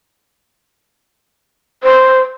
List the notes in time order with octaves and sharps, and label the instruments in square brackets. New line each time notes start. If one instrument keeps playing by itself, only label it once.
[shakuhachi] C5